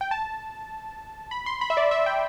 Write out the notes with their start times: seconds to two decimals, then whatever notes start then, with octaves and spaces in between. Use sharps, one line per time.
0.01 G5
0.11 A5
1.31 B5
1.46 C6
1.61 B5
1.70 E5
1.77 D5
1.91 E5
2.06 G5